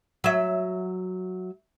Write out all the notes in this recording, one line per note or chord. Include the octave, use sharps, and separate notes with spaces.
F#3 E5